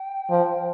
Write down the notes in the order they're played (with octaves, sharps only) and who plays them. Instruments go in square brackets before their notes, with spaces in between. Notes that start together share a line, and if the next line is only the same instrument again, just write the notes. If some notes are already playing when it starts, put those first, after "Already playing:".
Already playing: [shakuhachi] G5
[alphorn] F3